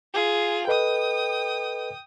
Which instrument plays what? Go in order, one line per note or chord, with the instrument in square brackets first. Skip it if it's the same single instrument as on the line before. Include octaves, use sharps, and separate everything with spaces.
[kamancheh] F4 G#4
[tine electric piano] A4 B4 D#5 [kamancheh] G5 D#6